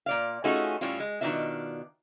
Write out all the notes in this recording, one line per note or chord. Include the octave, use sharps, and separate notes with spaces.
A#2 D5 F5
A3 C#4 D#4 F4 F#4 G#4
A2 G3 C#4 E4 F4
G#3
B2 D#3 A3 D4 F4 E5